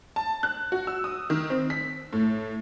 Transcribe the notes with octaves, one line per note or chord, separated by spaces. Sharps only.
A5
F#6
F#4
E6
D#6
D#3
C4
B6
A2